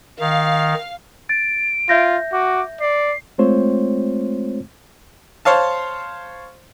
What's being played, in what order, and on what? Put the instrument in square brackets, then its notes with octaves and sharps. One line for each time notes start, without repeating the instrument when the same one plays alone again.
[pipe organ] D#3 [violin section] F5
[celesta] A6 [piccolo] D7
[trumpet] F4 [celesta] E5 G6 A#6
[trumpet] F#4 [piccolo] D6
[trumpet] D5 [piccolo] C7
[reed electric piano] G#3 A3 C4 F4 C5 C#5
[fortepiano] C5 C#5 F5 A5